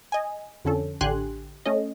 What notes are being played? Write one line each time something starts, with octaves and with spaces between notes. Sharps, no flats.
D#5 G#5
F2 D3 C#4 A4
A1 D3 G4 G#5 C6 F#6
A3 C#4 D#5